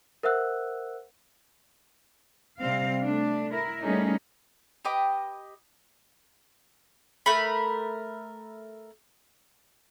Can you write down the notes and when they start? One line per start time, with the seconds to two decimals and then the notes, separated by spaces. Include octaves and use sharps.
0.23 A#4 C5 E5 F#5 E6 F#6
2.59 C3 G3 C4 F5
3.01 A3 D4
3.51 E4 A#4
3.84 G3 A3 A#3 C#4 D#4 G#4
4.85 G4 B4 D#5 D6
7.26 A3 A#4 B5